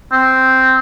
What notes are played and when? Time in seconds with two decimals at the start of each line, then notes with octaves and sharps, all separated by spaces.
0.12 C4